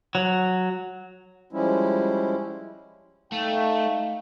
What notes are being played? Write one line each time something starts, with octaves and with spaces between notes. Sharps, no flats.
F#3
F3 G3 G#3 C#4 E4
A3 D#4 F5 G5